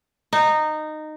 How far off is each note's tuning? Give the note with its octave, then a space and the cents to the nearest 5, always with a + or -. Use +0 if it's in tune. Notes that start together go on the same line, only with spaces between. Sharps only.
D#4 -15